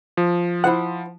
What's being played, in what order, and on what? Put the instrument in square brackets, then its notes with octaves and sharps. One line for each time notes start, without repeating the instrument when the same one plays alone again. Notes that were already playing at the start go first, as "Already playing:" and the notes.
[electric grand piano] F3
[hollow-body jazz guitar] E4 C5 F#5